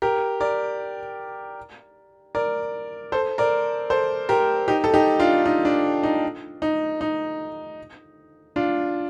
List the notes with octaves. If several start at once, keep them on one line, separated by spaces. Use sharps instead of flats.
G4 A#4
A#4 D5
A#4 D5
A4 C5
A#4 D5
A4 C5
G4 A#4
D#4 G4
A4
D#4 G4
D4 F4
D#4
D4
D#4
D#4
D#4
D4 F4